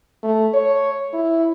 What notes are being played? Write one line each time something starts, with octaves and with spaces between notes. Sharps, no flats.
A3
C#5
E4